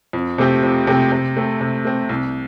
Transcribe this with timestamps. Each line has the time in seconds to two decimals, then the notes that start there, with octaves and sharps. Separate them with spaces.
0.13 F2
0.38 C3 A3 C4 G4
0.63 F2
0.87 C3 A3 C4 G4
1.12 C3
1.37 A3 C4
1.61 C3
1.85 A3 C4
2.09 C2